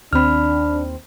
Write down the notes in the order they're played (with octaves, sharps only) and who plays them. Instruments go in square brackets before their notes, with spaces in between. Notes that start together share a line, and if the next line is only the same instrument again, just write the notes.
[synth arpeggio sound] D#2 C4 [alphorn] D4 [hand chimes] B5 F6